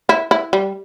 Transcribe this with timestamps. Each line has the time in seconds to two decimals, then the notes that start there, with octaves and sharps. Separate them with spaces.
0.09 E4
0.31 E4
0.53 G3